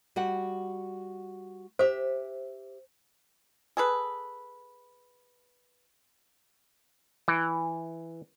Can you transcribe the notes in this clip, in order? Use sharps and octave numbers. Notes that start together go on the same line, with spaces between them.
G3 F#4 F#5
G4 C5 E5
G#4 A4 B4
E3